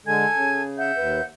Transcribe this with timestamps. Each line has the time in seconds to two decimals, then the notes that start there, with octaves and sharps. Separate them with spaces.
0.06 D3 G#3 A4 G#5 G#6
0.34 C#3
0.77 E5 F#5 G6
0.98 D#2 B4